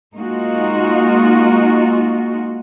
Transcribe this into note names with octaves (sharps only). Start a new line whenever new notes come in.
G#3 A#3 D#4 F4 F#4